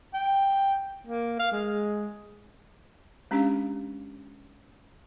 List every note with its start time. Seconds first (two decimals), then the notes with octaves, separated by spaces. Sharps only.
0.14 G5
1.07 A#3
1.39 F5
1.52 G#3
3.31 G#3 C#4 D4 G4 F5 A#5